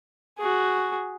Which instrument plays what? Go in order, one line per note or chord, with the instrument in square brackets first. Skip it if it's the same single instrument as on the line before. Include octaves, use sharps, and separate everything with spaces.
[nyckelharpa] F#4 G#4